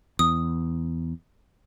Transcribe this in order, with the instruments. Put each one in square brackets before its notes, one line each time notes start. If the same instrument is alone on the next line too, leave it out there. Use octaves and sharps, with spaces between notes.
[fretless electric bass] E2 [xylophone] D#6